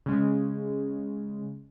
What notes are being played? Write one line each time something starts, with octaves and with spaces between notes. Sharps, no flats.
C#3 G#3